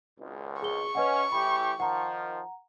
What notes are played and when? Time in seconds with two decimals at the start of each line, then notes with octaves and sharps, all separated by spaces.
0.19 G#1 C#2
0.62 G#4 C#6 G7
0.95 C#4 B4 D#5 F#5
1.32 A2 E3 G4 B5
1.80 D#3 F3 F#5 A#5